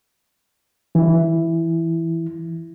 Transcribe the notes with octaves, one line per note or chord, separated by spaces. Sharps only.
E3 E4